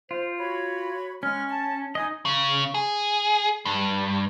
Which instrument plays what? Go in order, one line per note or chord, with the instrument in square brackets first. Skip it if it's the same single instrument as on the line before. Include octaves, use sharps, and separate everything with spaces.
[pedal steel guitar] F4 [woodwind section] C5
[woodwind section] F#4 C#5 B5
[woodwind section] G#3 F6 [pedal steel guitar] C#4
[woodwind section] A5
[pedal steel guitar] D#4 D#5 [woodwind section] G#5 D#6
[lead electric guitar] C#3
G#4
G2